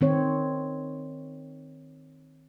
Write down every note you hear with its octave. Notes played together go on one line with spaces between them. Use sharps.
D#3 C4 C#5